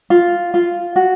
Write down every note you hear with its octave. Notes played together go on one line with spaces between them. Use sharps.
F4
F4
F#4